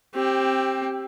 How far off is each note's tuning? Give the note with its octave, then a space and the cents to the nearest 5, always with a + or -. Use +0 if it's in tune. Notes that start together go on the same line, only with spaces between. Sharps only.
C4 +20 G4 +0